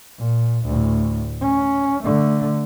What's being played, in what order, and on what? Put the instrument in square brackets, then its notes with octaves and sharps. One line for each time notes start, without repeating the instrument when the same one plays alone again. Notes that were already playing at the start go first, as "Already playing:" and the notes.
[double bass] A#2
D2 A2
C#4
D3 A3